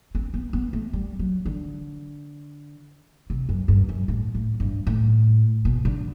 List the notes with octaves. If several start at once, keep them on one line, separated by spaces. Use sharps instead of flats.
C4
B3
B3
A3
G3
F#3
D3
C3
F#2
G2
F#2
A2
A2
G2
A2
B2
D3